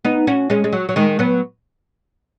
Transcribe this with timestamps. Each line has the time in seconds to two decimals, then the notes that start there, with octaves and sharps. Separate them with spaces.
0.05 B3 D#4
0.27 C#4 F#4
0.50 G#3 C#4
0.64 G#3
0.73 F#3
0.89 F#3
0.96 D#3 G#3
1.19 F#3 B3